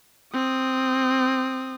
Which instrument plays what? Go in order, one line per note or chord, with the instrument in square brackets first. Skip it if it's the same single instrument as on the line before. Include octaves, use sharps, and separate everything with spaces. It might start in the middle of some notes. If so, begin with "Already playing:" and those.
[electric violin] C4 D#6